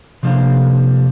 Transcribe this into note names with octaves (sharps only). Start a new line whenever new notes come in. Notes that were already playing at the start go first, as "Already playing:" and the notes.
C3 F3 A#3 D4 C5 F5